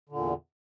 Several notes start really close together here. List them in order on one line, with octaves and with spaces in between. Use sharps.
D3 A#2 E2